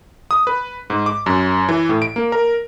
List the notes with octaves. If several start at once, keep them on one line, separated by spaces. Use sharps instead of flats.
D#6
B4
G#2
D6
F#2
E3
A2
D7
A#3
A#4